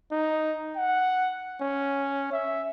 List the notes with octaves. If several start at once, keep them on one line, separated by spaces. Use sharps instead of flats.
D#4
F#5
C#4
E5